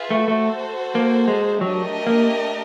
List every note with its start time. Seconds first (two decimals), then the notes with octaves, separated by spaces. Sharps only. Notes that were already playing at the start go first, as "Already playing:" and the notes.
Already playing: F4 G#4 B4 E5
0.10 A3
0.27 A3 F#4 A4 C5
0.95 A#3
1.28 G#3
1.61 F#3 A3 D4 G4 A#4 D#5
2.07 A#3